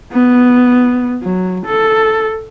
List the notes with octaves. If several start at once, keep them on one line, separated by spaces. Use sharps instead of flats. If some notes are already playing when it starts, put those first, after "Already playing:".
B3
F#3
A4